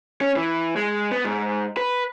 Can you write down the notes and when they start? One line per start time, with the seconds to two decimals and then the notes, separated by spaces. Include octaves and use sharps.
0.21 C#4
0.37 E3
0.76 G#3
1.12 B3
1.25 G#2
1.77 B4